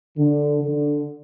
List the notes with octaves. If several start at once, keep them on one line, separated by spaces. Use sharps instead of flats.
D3
D3